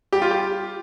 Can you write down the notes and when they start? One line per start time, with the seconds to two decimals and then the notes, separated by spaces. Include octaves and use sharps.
0.13 G3 G4
0.22 F4
0.31 G4